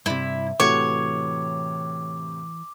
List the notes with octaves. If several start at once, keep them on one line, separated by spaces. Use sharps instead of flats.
G2 C3 E4
A2 C3 E3 A3 F#4 C#5 D6